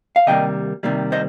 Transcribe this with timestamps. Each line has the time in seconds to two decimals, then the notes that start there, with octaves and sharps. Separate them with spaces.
0.16 F5
0.27 C3 D#3 G3 A#3 D#5 G5
0.83 C3 D#3 G3 A#3
1.12 C5 D#5